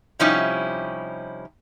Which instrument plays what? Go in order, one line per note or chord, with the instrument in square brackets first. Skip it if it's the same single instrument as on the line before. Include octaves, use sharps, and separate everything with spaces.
[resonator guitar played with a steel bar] C3 F3 G3 C#4 D#4 E4